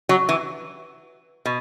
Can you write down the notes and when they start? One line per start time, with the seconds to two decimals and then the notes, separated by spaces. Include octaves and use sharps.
0.09 F#3
0.29 E3
1.45 B2